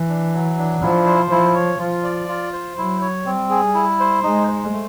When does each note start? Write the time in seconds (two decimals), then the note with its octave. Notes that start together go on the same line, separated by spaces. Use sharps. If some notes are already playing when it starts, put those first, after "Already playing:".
Already playing: E3
0.09 D4
0.33 F#3
0.58 D4
0.81 F3 E4
1.06 C5
1.31 F3 E4
1.55 C#5
1.79 F3 F4
2.03 D5
2.28 F4
2.53 C5
2.77 F#3 E4
3.01 C#5
3.26 G3 C4
3.50 G#4
3.74 E4
4.00 C5
4.23 G#3 D#4
4.48 C5
4.72 A3